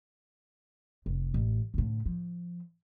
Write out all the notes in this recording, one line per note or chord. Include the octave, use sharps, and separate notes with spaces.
F1
A1
A2 D3
F3